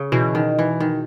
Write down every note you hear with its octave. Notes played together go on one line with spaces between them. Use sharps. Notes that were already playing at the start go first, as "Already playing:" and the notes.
Already playing: C#3
B2 E3
D#3
E3
D#3